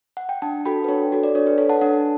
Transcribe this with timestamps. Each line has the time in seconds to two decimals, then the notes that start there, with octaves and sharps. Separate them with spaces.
0.17 F#5
0.29 G5
0.42 D4 F#5 A5
0.65 F#4 A4 G5 B5
0.84 B4
0.88 D4 C#5
1.12 F#4 A4
1.23 D5
1.35 D4 C#5
1.47 B4
1.58 A4 C#5
1.69 F#5 A5
1.81 D4 F#5 A5